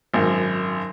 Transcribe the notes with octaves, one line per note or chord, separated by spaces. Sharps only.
G#1 F#2